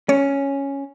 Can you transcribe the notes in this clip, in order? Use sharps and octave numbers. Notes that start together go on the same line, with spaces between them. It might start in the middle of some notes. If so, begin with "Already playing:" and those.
C#4 C#5